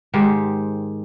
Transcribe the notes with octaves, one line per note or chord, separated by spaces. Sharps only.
G#2 D#3 G4 C5